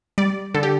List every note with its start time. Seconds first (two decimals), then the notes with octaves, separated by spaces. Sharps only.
0.18 G3 D5
0.54 D3 A4
0.63 G4